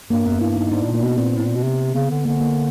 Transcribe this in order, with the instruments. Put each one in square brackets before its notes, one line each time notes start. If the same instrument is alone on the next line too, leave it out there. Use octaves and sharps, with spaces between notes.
[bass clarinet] G2 [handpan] A#3
[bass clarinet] F#2 [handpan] B3
[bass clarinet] G2 [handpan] E4
[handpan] D#4
[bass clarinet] G#2 [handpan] D4
[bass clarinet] A2
A#2
[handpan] A#3
[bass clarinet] B2 [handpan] B3
[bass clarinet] A#2 [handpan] C4
[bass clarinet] A2
A#2
B2
C3
[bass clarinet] C#3 [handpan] B3
[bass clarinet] D3
[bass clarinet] D3 [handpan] A#3
[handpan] A#3